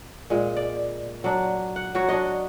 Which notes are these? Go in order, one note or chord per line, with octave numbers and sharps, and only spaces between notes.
A#2 G#3
D5
F#3 D4
F#5
F#3 F#4 C#5
D4 F#4 C#5 D#5